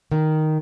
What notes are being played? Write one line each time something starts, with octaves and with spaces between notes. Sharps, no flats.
D#3